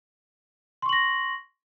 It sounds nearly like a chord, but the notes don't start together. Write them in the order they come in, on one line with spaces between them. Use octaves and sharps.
C6 C#6 F#7 A#6